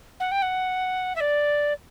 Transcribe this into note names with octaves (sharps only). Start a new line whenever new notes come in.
F#5
G5
F#5
E5
D5